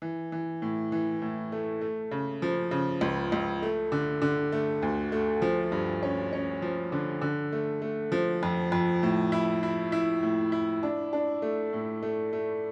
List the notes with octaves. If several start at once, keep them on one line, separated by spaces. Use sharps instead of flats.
E3
E3
A2
E3
A2
A3
A3
C#3
F3
C#3
C#2
C#2
A3
D3
D3
A3
D2
A3
F3
G2
C#4
C#4
F3
D3
D3
A3
A3
F3
F2
F2
A2
E4
E4
E4
A2
E4
D4
D4
A3
A2
A3
A3